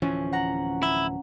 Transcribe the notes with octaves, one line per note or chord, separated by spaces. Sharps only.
D1 E3 F3 C#4
F#5 A#5
E4